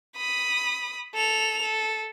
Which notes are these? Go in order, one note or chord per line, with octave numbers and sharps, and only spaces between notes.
B5 D#6
A4 F7
A4